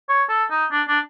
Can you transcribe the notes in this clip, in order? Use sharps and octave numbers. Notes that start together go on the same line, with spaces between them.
C#5
A4
D#4
D4
D4